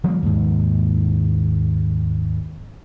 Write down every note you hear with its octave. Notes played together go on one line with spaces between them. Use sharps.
F3 G3 A3 A#3
D#2 G#2